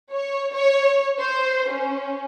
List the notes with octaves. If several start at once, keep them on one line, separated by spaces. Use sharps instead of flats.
C#5
C#5
C5
C#4